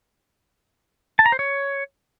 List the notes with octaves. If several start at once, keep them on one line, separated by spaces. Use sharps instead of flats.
A5
A#5
C5
C#5